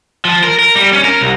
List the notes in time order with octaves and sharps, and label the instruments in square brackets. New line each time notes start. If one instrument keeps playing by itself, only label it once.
[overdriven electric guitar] F3
A#4
A#4
G3
C#4
A#4
C2